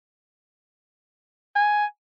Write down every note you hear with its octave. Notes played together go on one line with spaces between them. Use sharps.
G#5